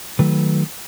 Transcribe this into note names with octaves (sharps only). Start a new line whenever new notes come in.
D#3 F#3 A3 B4